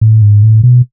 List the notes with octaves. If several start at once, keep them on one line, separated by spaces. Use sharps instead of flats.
A2
G#2
A2
B2